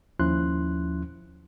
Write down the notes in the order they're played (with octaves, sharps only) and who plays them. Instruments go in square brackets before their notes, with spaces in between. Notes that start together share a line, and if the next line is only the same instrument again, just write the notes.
[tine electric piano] D#2 F3 C#4 E4 C6 F#6